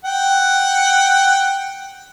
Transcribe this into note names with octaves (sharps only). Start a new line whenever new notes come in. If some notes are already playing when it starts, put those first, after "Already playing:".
F#5 G5